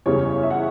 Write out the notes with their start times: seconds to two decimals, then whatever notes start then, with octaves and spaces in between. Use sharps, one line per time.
0.06 F#1 E2 C#3 G3 C#4 C#5
0.43 E5
0.51 F#5